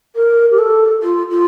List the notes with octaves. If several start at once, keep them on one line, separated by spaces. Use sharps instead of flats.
A#4
G4
A4
F4
F4